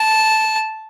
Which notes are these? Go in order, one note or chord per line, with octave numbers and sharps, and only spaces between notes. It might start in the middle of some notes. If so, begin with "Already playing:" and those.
Already playing: A5